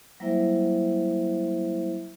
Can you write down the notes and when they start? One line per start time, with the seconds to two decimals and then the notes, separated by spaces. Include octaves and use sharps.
0.20 F#3 G3 A#3 E4 C5 E5